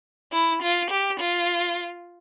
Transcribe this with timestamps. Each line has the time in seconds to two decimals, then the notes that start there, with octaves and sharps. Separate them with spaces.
0.32 E4
0.62 F4
0.90 G4
1.20 F4